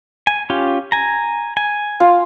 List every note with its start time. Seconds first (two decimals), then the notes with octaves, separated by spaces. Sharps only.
0.27 G#5
0.50 C#4 F4 G4
0.92 G#5 A#5
1.57 G#5
2.00 F4